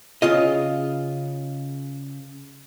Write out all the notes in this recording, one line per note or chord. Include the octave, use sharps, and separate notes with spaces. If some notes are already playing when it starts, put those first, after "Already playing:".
C#3 F4 D#5